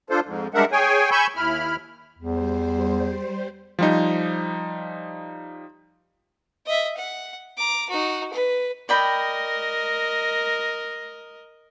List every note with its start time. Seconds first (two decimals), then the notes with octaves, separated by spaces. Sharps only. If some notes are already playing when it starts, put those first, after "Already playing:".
0.10 D4 F4 A4 C5
0.25 F2 G#2
0.54 G3 G#3 D4 A#4 E5 F#5
0.72 G#4 C#5 G5 G#5
1.11 G#5 B5 C#6 E6 G6
1.36 D#2 E4 B5 F6
2.18 E2 G3 C5
3.79 F3 G3 D#4
6.66 D#5 E5
6.97 F#5
7.57 A#5 D6
7.89 D#4 F#4
8.33 B4
8.89 A#4 D5 D#5 G5 B5